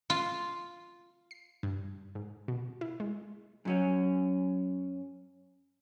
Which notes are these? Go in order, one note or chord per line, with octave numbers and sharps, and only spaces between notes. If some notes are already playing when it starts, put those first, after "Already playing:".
F4
C7
G2
G#2
B2
E4
G#3
F#2 F#3 C#4